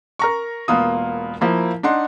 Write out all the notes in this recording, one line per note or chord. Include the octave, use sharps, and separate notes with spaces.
A#4 A#5 C#6
E1 A#3 B3 F4 D#6
F3 A#3 E4
D4 D#4 F#5 C6